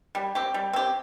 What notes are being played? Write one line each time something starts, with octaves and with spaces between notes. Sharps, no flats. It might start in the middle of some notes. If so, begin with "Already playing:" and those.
G3
C4 G4
G3
C4 G4